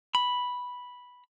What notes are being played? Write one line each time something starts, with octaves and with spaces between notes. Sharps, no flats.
B5